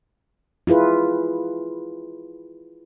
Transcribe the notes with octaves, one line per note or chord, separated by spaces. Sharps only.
E4 F4 G#4 B4